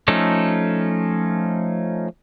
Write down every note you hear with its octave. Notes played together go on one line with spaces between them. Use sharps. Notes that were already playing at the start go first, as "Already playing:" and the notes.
F3 A3 C#4 D#4 A4